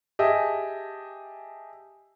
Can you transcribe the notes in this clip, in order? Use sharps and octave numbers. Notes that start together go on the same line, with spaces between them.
G4 G#4 D#5 E5 A5